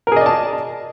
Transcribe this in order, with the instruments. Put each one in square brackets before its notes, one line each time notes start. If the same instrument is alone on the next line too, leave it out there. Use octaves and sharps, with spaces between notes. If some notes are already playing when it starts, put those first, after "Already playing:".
[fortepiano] A#4
G#4
D#5
D5
A5